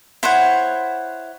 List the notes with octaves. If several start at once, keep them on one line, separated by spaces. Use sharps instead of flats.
E4 C5 C#5 F#5